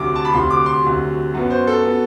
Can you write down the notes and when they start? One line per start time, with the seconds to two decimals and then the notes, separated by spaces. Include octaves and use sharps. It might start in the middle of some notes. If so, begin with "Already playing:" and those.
Already playing: D2 C3 F#3 D6
0.15 A5
0.25 B5
0.32 D2 C3 F#3 C6
0.50 D6
0.66 C6
0.83 D2 C3 F#3
1.34 F#2 F#3 B3
1.50 C5
1.67 A4
1.83 F#3 B3